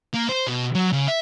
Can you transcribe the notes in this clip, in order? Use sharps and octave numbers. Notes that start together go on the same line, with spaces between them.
A#3
C5
B2
F#3
C#3
E5